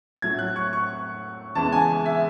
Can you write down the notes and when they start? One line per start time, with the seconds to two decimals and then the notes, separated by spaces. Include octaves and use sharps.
0.22 A2 F#3 A3 G#6
0.39 F#6
0.56 C#6
0.73 C#6
1.55 E2 C#3 E3 G#3 A5
1.72 G#5
2.06 E5